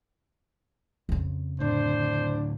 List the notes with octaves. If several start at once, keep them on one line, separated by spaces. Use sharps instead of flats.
F2 C#3
A2 D3 D4 C5